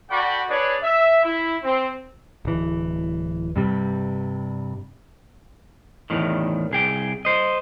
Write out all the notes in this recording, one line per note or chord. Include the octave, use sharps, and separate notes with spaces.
F#4 A4 D5 F#5 G5 B5
D4 G#4 B4 C#5 D5
E5
E4
C4
D1 E3
G2 C3 G3
E2 A2 D#3
C2 G#4 G5
C5 D#5